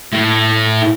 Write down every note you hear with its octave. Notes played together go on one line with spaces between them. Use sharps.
A2